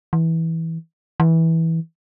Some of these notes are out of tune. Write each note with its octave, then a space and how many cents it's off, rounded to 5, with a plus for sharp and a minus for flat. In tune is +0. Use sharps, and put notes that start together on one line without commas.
E3 -15
E3 -15